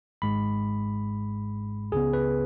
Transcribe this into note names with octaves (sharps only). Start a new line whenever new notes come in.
G#1 G#2 G#3 B5
C#2 C#3 B3 G#4
B4